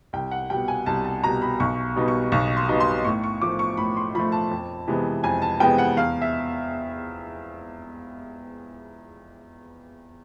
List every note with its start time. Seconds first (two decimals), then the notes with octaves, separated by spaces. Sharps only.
0.13 C2 G5
0.31 F#5
0.50 B2 G3 G5
0.68 G#5
0.86 C2 A5
1.04 A5
1.23 B2 G3 A#5
1.42 B5
1.60 B1 C#6
1.96 B2 G3 B3 D#4
2.08 C#6
2.32 B1 C#6
2.57 C6
2.68 B2 G3 B3 D#4
2.80 C6
3.05 A2 C#6
3.24 C#6
3.42 F3 A3 D6
3.59 C#6
3.77 A2 B5
3.97 C6
4.15 F3 A3 B5
4.32 A5
4.51 F2
4.87 C3 E3 G#3 B3
5.24 F2 G#5
5.42 A5
5.60 C3 E3 G#3 B3 G5
5.78 F#5
5.97 E2 F5
6.22 E5